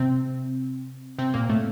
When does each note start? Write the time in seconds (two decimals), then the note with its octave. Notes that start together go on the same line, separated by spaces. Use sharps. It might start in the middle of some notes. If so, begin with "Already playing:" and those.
Already playing: C3 C4
1.19 C3 C4
1.34 A#2 A#3
1.49 A2 A3